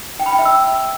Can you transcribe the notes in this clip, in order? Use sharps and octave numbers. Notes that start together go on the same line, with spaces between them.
G5
B5
G5
E5
E6